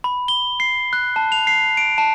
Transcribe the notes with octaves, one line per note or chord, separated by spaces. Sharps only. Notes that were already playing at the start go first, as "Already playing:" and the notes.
B5
G7
C7
F#6
A5
F7
C7
D7
A5